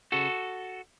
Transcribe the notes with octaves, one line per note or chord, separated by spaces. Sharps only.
C#3 F#4 A4